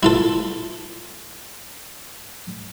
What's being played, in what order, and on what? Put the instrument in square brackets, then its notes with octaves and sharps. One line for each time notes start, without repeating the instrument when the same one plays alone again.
[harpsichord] E4 F4 A4